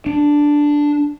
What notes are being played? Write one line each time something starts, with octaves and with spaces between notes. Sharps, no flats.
D4